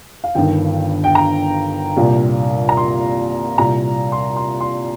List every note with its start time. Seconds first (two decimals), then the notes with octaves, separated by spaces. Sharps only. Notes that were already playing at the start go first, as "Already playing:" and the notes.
0.24 F5
0.35 G1 G2 D#3 G5
1.04 G5
1.15 A#5
1.97 C2 A#2
2.69 A#5
2.77 C6
3.58 C2 A#2 A#5
4.12 C6
4.36 C6
4.61 C6